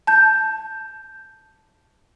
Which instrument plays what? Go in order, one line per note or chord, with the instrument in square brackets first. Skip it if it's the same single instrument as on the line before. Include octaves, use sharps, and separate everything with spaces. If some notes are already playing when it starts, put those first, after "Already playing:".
[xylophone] A5 G6